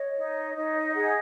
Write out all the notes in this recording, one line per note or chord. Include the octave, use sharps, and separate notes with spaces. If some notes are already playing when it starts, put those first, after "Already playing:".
Already playing: C#5 D#5
D#4
D#4 C#5
D#5
G#4 F#5